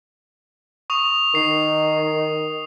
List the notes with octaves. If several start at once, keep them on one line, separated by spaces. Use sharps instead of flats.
C#6 D#6 F7
D#3 C#6 C7